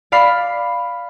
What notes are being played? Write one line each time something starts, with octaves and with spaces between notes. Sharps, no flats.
D5 F5 B5 C7